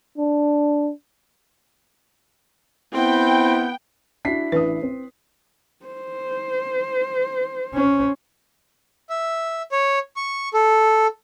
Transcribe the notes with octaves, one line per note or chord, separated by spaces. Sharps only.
D4
B3 C4 E4 G5
D4 E4 F#4 B6 C7
A1 D4 B4 D#6
C4
C5
C#4
E5
C#5
C#6
A4